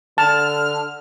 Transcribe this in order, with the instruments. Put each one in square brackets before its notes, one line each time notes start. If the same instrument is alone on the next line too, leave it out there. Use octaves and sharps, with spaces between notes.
[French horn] D3 [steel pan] A5 [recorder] F6